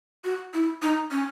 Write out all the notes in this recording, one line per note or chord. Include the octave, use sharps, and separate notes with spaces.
F#4
E4
D#4
C#4